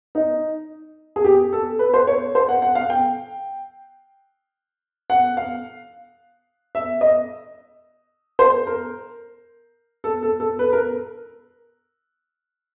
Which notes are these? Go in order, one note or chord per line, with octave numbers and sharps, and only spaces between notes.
D#4
G#4
G4
A4
B4
C5
C#5
C5
F#5
F#5
F5
G5
F#5
F5
E5
D#5
C5
A#4
A4
A4
A4
B4
A#4